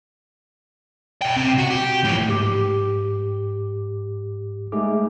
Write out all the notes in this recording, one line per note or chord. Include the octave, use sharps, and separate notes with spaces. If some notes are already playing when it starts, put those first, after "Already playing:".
B2 G5
C3
F#4
G4
A2 F3
G#2 G4 D6
G#3 A3 D#4 G#4 D6